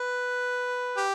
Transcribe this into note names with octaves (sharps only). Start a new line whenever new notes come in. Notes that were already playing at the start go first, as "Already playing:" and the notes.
Already playing: B4
G4